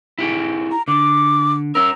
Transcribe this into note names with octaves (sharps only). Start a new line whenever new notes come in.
E4 G4 G#4
A#5
D3 D6
C#4 A#4 E6